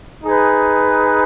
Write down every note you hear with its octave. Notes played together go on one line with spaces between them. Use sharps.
D#4 G#4 B4